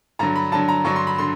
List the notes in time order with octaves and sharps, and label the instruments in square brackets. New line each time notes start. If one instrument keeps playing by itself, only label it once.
[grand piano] G2 D3 F#3 A#5
B5
G2 D3 F#3 A5
A#5
G2 D3 F#3 C#6
C6
B5
D3 C6